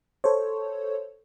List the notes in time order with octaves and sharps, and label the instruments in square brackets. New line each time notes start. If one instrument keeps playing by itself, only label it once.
[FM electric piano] A4 C5 C#5